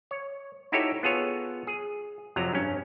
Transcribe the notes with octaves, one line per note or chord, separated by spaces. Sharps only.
C#5
D#4 E4 F#4 G4 A4 C#5
B3 F4 G#4 A4 C#5
G#4
F2 C3 F#3 A#5
G2 C#4